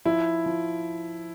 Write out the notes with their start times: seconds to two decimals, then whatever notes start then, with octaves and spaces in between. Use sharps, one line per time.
0.05 F3 E4
0.46 F3